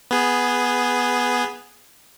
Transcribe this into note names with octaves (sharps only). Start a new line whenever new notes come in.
B3 G#4